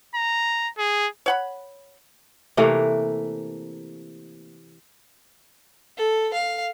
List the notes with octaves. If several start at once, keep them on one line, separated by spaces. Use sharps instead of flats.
A#5
G#4
C#5 F#5 B5
C3 E3 A3 A#3
A4
F5